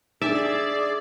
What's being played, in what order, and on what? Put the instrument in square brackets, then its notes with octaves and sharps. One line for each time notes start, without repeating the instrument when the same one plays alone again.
[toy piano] D4 D#4 [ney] G#4 [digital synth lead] D5 [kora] E5